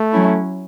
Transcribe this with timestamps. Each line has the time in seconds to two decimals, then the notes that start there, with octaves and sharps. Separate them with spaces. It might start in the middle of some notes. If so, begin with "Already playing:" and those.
Already playing: A3
0.13 F#3 C#4 E4